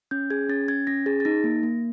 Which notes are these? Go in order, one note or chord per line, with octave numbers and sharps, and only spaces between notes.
C#4 G6
G#4 G#6
C#4 A6
C#4 G#6
C#4 A#6
G#4 A6
A6
D#4 A#6
A#3
A#3